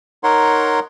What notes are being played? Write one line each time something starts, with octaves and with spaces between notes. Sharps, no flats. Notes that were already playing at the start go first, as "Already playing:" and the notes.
D#4 A#4 C#5 F#5 C6